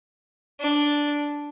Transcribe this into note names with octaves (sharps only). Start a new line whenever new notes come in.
D4